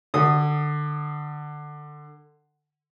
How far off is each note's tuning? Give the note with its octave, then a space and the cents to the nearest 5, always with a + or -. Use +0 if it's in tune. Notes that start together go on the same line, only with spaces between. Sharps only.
D3 +20 D#6 -15